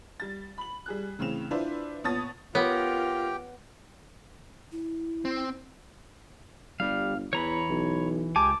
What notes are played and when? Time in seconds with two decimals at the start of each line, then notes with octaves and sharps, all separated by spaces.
0.20 G3 A6
0.58 B5 F#7
0.86 G3 G#4 F#6
1.19 A2 C#3 E3 C4 E7 F7
1.51 D4 E4 F4 B4 C5 D5
2.04 A#2 B3 C#5 A5 D#6 A6
2.55 B3 F4 G4 A#4 C#5 G5
4.72 E4
5.25 C4
6.80 G1 G3 F5
7.33 E2 E3 C#5 A#5 B5
7.69 B1
8.36 C#2 G4 G#5 A5 D6